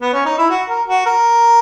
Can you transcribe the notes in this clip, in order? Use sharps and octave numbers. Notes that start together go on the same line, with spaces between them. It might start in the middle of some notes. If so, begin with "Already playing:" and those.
B3
C#4
D#4
E4
F#4
A#4
F#4
A#4